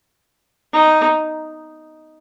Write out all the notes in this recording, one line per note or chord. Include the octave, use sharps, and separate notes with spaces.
D#4